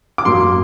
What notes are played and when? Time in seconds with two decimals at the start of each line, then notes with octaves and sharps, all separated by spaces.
0.18 D6
0.25 F#2 F#3 A#3 C6